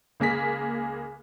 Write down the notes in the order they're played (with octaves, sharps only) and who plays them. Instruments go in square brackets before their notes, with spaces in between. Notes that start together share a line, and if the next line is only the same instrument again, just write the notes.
[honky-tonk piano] C#2 A#3 G#4 B6